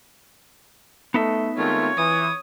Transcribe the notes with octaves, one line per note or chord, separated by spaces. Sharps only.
A3 B3 D#4 E5
D#3 G#3 A3 C4 F4 C#5
E3 D#6